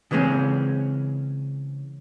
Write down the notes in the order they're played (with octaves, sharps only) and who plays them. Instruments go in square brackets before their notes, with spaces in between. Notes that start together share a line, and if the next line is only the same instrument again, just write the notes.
[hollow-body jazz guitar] C#3 E3 G#3 C4 C#4